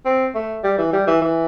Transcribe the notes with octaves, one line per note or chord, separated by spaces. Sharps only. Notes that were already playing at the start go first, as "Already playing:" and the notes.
C4
A3
G3
E3
G3
E3
E3